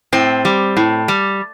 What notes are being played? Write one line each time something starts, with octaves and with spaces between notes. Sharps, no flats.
A2 C4
G3
A2
G3